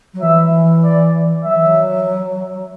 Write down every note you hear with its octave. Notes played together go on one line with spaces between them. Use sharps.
F#3
E3 E5
D5
F#3 E5
E3
F#3